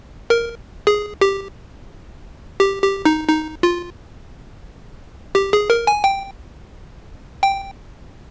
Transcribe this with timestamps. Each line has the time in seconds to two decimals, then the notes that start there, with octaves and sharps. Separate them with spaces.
0.30 A#4
0.87 G#4
1.21 G4
2.60 G4
2.82 G4
3.05 D#4
3.28 D#4
3.63 F4
5.35 G4
5.53 G#4
5.70 A#4
5.87 G#5
6.04 G5
7.43 G5